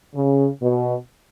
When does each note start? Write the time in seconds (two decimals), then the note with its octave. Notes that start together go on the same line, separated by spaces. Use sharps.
0.15 C#3
0.62 B2